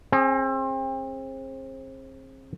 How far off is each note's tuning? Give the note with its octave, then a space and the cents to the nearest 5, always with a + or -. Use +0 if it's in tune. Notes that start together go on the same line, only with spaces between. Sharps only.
C4 +35 G#4 +0